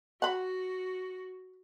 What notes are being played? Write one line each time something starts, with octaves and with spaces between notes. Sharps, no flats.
F#4 F#5 B5